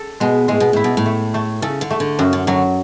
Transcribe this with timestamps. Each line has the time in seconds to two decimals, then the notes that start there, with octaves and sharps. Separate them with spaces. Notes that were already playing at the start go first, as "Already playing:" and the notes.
Already playing: A4
0.20 B2 G#3
0.48 A2 G#3
0.60 B2
0.73 A2 E4
0.84 B2
0.97 A2
1.06 A3
1.34 A3
1.62 C#3 A4
1.81 D3
1.91 A3
2.00 D3
2.19 F#2 C#3
2.33 D3
2.47 D3 F#3